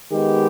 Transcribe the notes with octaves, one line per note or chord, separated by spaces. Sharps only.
D#3 G#3 B3 G4